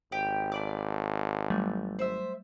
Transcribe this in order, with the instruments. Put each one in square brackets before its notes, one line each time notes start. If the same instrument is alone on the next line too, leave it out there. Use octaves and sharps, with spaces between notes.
[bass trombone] G#1 [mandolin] G4 G5
[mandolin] A3 D5 D6
[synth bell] F#3 G3 A3
[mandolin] C5 E5